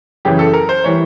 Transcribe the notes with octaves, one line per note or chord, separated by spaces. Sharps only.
F#2 C#3 E3 G4
A4
A#4
C5
E3 G3 C#5